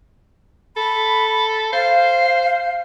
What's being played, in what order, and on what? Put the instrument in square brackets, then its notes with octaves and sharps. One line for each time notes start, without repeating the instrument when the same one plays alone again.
[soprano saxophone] A4 [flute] B5
[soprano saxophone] C5 [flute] F5